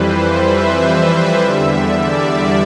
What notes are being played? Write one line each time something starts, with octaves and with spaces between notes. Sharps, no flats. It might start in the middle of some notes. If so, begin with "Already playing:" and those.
Already playing: F2 E3 G3 B4 C5
E5
E5
E2 D3 G3
D5